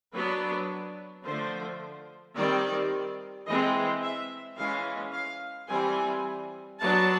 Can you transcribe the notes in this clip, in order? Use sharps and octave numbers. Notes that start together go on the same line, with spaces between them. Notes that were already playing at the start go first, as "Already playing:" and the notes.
F#3 B3 D4 B4
D3 F3 A3 C5
D#3 G3 C4 D5
E3 G#3 C4 D#5
E5
E3 G#3 C#4 F5
F5
E3 G3 C4 G#5
F#3 B3 D4 A5